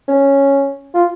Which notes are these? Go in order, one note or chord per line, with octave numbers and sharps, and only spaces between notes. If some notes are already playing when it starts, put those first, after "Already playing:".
C#4
F4